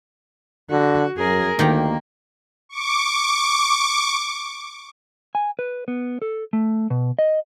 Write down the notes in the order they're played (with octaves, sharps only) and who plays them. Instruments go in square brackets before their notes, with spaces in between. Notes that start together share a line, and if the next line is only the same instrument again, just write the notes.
[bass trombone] D3 [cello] F#4
[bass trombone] F#2 [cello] G#4 A#4
[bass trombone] D2 [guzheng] D#3 G4 A#5 [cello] A#3
[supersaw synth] C#6 D6
[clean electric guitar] G#5
B4
B3
A4
A3
B2
D#5